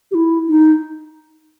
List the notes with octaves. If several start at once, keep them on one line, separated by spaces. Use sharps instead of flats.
G4
E4
D#4